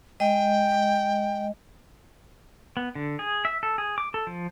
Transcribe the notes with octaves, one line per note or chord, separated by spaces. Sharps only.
G#3 D#5 G5
B3
D3
G#4
E5
A4
G#4
D6
A4
F3